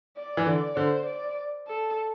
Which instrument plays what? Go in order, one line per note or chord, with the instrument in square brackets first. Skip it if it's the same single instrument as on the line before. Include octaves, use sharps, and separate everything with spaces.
[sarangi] D5
[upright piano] E3
[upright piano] D3 [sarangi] D5
[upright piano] D3 [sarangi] C5
[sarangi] D5
A4